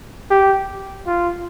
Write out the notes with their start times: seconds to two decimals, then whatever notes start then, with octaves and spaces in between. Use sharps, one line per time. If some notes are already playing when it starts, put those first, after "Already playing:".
0.31 G4
1.07 F4